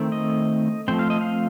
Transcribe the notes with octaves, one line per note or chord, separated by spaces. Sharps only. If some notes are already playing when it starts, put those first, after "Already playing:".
Already playing: D#3 A3 C4
D#5
F3 A3 C4 G5
F5
D#5
F5